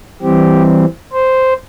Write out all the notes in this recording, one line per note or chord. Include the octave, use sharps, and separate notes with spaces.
E3 G3 C4 G4
C5